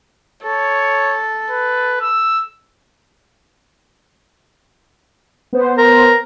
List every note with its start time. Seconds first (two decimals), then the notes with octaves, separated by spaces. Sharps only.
0.43 A4 C#5
1.50 B4
2.00 E6
5.53 B3 C5
5.78 A#4